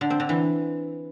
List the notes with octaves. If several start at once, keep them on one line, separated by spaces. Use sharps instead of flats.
D3
C4
D3
E3